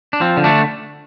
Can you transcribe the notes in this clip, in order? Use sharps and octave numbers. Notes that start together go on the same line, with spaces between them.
D4
F3 C4
D3
A3 D4